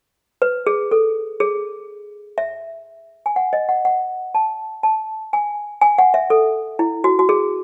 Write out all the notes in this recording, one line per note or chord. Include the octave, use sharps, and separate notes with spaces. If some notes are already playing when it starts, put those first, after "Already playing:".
B4
G#4
A4
G#4
E5
G#5
F#5
D#5
F#5
F#5
A5
A5
G#5
G#5
F#5
E5
A4
E4
F#4
F#4
G#4